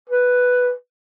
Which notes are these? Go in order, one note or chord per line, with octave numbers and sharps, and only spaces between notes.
B4